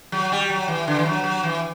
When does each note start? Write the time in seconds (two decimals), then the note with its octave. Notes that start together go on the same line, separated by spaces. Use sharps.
0.12 F#3
0.32 G3
0.50 F#3
0.68 E3
0.87 D3
0.99 E3
1.06 F#3
1.24 F#3
1.43 E3